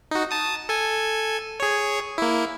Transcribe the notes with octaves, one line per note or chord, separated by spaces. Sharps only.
D#4 F#4
A5 D#6
A4 G#5
G#4 C#5
A#3 E4